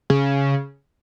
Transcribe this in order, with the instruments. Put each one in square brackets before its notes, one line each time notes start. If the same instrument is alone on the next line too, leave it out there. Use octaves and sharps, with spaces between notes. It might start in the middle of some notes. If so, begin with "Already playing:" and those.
[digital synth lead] C#3